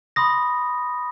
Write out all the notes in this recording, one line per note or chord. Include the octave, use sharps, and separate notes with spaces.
B5 C6 D#6 A#6